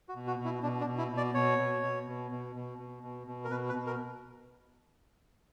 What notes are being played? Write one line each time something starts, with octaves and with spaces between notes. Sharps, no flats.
F#4
B2
F#4
B2
E4
B2 D4
D4
B2
E4
B2
D5
B2 C#5
B2
B2
B2
B2
B2
B2
B2
B2
A#4
B2 B4
B4
B2
A#4